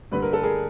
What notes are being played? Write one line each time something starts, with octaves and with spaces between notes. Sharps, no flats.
G2 D3 B4
A#4
A4
G#4 A#4